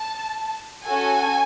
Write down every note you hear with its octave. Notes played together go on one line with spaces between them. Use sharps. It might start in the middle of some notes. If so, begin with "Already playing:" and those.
Already playing: A5
C#4 F#4 A4 G#5